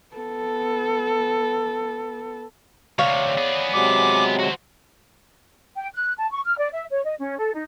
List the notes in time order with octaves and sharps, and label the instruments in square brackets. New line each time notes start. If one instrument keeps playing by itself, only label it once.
[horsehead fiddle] B3 A4
[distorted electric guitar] D2 C3 [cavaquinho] C#5 D5 F5
[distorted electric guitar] B3 G#4
[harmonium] C3 F#3 G#3 [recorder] D6
[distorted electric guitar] F#4 C5
[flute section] G5
F#6
A5
C#6
F6
D5
E5
C#5
D#5
C#4
A4
D#4